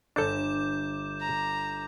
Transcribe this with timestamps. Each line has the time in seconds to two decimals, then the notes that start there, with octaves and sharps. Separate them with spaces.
0.16 G1 D4 A4 D6 G6 E7
1.21 A#5